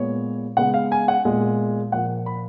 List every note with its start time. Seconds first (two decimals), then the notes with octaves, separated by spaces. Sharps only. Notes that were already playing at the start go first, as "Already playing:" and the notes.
Already playing: A#2 G#3 B3 C#5
0.57 C#3 G#3 B3 F#5
0.74 F5
0.92 G#5
1.08 F#5
1.25 A#2 G#3 B3
1.92 A#2 F3 A#3 F#5
2.26 B5